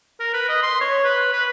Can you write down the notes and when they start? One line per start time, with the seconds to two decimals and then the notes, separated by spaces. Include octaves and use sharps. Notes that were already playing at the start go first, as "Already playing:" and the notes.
0.20 A#4
0.34 B4
0.49 D#5
0.63 C6
0.81 C#5
1.04 B4
1.33 B4